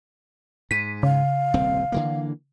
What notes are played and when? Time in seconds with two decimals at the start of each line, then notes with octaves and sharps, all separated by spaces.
0.71 G#2 B6 D#7
1.03 C#3 F5
1.54 D#1 C2 C4
1.92 D3 E3 A#3